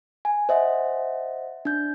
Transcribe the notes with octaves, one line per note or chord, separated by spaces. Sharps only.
G#5
C5 D#5 E5 F#5
D4 G6